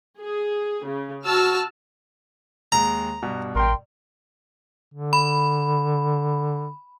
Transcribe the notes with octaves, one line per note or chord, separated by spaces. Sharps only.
G#4
C#3
F#4 A5 E6 F6
D#2 G#3 A#5
G2 B2
A1 A#4 G5 C6
D3
B5